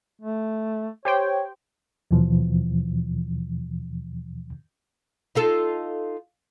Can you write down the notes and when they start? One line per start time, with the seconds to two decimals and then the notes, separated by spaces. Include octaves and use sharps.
0.22 A3
1.05 G4 C5 C#5 G5
2.11 D#2 B2 E3 F3
5.35 D#4 F4 A4